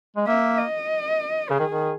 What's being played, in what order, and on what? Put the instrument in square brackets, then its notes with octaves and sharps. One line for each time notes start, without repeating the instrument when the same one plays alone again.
[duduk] G#3
[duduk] A#3 [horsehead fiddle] E5
[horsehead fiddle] D#5
[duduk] C#3 [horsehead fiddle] G#4
[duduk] D#3
D#3